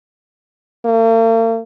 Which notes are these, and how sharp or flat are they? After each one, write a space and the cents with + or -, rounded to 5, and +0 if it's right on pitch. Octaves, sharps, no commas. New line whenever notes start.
A#3 -45